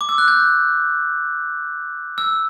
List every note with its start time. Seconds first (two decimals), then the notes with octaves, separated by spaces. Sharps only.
0.01 D6
0.09 E6
0.18 F#6
0.28 G6
2.18 E6